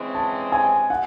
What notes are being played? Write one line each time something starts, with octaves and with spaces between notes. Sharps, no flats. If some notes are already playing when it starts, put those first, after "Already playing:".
Already playing: C#3 E3 G#3 C4
A5
G#5
F#5